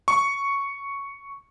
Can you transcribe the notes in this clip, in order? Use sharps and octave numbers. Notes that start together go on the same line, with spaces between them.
C#6